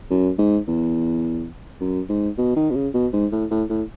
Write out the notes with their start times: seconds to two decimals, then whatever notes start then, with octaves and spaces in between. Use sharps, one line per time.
0.10 F#2
0.39 G#2
0.68 E2
1.81 F#2
2.09 G#2
2.38 B2
2.56 D#3
2.70 B2
2.75 C#3
2.94 B2
3.13 G#2
3.32 A2
3.51 A2
3.70 A2